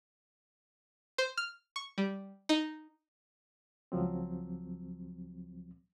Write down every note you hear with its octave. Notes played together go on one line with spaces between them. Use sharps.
C5
F6
C#6
G3
D#4
C#2 F3 F#3 C4